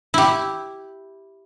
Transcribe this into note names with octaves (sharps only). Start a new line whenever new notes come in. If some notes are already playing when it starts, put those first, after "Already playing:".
E4 G4